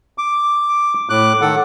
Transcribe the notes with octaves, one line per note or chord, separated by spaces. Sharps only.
D6
A2 D6 F#6
D#3 A4 F#5